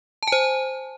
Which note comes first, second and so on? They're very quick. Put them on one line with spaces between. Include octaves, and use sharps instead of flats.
A5 G#5 C5